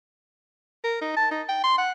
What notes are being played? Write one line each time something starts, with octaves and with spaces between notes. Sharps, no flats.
A#4
D#4
A5
D#4
G5
C6
F#5